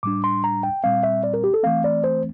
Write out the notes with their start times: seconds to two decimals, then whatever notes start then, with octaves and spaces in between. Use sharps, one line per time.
0.03 A2 G3 D4 D6
0.24 C6
0.44 A#5
0.63 G5
0.84 A#2 G3 C4 F5
1.03 E5
1.23 D5
1.34 A#4
1.44 G4
1.54 A4
1.63 E3 A3 C4 F5
1.84 D5
2.04 C5